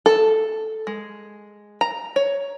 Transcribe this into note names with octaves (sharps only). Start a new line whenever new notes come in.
A4
G#3
A#5
C#5